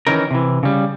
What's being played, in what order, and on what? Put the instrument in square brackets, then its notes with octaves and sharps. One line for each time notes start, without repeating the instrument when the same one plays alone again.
[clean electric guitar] D#3 E3 C#4 D#4 A#4
C3 E3
C#3 G3